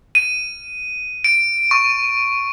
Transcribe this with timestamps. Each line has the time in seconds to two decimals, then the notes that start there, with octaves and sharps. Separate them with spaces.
0.15 D#7
1.24 D7
1.71 C#6